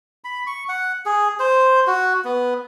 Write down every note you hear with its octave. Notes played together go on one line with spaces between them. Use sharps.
B5
C#6
F#5
G#4
C5
F#4
B3